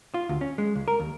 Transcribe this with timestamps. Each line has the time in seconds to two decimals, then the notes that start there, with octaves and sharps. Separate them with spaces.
0.14 F4
0.29 D2
0.41 C#4
0.58 G#3
0.75 C#2
0.88 A#4
1.00 D#2